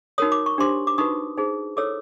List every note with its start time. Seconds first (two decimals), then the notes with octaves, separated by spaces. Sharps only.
0.18 D#4 F#4 A#4 C#5 D#6
0.32 D6
0.46 C#6
0.58 D4 G4 C5 C6 D6
0.87 D6
0.98 D#4 F#4 B4 C#6 D#6
1.37 D#4 G#4 C5
1.77 E4 A4 C#5 D6 E6